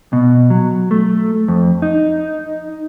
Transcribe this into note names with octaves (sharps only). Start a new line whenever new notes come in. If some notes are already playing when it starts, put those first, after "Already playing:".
B2
F#3
A3
F2
D#4